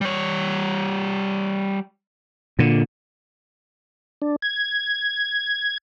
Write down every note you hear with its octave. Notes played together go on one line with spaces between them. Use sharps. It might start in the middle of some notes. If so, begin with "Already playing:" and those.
G3 C#5
A#2 D3
D4
G#6